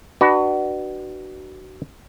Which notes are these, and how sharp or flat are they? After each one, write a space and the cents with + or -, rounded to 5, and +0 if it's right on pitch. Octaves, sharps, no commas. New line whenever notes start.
D4 +35 F#4 +25 B4 +0